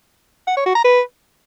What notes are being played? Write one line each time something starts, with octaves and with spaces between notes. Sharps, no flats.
F#5
C#5
F#4
A#5
B4